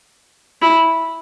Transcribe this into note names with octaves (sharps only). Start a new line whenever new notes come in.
E4